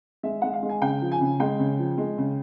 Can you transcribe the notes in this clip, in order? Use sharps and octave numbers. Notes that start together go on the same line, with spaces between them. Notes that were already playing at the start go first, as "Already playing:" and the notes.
G#3 E5
G#3 F#5
F5
G#3
G#5
C#3 G5
F3
G#5
C#3
G#3 G5
C#3
F3
G#3
C#3